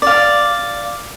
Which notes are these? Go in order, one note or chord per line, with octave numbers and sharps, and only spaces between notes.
D5 F5